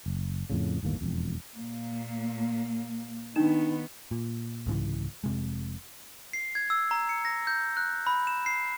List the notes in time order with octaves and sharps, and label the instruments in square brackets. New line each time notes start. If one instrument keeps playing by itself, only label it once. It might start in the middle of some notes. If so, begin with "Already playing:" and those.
[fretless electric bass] F#1
F2 A2 C#3
G1 D#2 A2 A#3
E1 F2
[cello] A#2 A#3
[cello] D#3 B3 [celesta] D4 D#4 E7
[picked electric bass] A#2
C2 G#2 C#3 E3
F1 C3 G#3
[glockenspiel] C7
G#6
E6
A#5
C#7
A#6
G6
F#6
B5
E7
C7